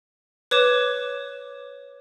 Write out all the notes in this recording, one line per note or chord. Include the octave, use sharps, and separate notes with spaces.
B4 C#5 D6 E7